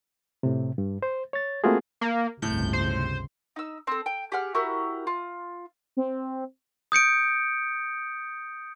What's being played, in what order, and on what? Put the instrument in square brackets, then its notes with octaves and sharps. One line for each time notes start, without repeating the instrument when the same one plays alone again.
[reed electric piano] A2 C3
G2
C5
C#5 A6
A3 A#3 C4 F4 F#4 G#4
[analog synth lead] A#3
[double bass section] G1 C#2 C3 [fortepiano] A2 [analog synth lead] G6
[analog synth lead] C5
[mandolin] D#4 E6
C4 A4
G5
G4 G#4 F#5 F6
E4 F#4 G4 A#4
F4
[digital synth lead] C4
[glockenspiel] D#6 G6 C#7 D7